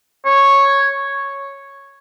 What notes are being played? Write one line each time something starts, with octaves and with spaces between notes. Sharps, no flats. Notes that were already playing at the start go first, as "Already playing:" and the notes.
C#5